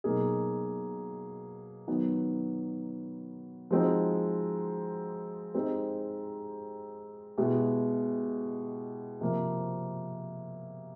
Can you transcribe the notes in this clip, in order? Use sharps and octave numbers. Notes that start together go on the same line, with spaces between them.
B2 F#3 A#3 D#4 G#4
D#3 F#3 B3
F3 G#3 C4 D#4 F#4
G#3 C4 D#4 G4 C5
B2 G#3 B3 E4 G4
C3 F3 A#3